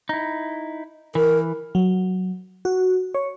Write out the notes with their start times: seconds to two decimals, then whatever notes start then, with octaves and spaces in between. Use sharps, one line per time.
0.09 D#4 E4
1.15 E3 A#4
1.75 F#3
2.65 F#4
3.15 C#5